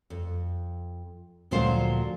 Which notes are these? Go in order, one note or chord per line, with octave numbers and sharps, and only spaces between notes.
F2
D2 A#2 F3 F#3 C5 F5